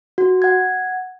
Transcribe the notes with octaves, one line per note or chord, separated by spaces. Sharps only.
F#4
F#5 G#6